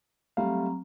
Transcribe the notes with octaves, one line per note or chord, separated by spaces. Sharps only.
F#3 G3 A3 C4 F5 A#5